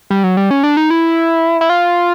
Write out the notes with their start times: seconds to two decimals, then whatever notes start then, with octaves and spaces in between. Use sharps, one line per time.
0.10 G3
0.24 F#3
0.37 G3
0.51 C#4
0.64 D4
0.77 D#4
0.90 E4
1.61 E4
1.70 F4